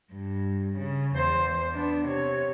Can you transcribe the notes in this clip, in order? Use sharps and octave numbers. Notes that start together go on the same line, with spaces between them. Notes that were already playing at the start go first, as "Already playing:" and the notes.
G2
C#3
E2 C5
B3 D4
C3 C#5